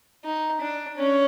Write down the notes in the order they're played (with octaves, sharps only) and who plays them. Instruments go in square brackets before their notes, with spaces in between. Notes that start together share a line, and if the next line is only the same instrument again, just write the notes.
[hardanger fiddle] D#4
D4
C#4